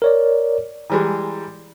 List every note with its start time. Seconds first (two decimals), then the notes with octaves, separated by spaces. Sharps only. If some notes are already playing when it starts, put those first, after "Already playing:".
0.02 A#4 C#5 D5
0.90 E3 G3 G#3 A#5